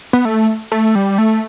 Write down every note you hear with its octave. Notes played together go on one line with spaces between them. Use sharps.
B3
A3
A3
G3
A3